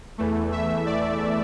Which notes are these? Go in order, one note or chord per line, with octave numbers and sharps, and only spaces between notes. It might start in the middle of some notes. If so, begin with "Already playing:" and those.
E2 E3 A3
E5
D5